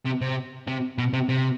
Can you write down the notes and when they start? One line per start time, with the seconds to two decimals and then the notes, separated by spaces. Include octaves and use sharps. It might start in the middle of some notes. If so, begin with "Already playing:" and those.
0.06 C3
0.21 C3
0.67 C3
0.98 B2
1.13 C3
1.29 C3